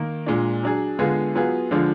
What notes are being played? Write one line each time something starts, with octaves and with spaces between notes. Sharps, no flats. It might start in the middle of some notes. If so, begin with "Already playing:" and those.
Already playing: D#3 A#3
A#2 G#3 D4
F#3 D4 G#4
D3 G#3 B3 F4 G#4
F#3 B3 F4 G#4
D3 F3 G#3 D4 F4